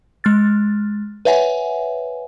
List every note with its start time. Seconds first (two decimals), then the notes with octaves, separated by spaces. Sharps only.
0.24 G#3 F6 A6
1.25 B4 C#5 E5 F#5 G#5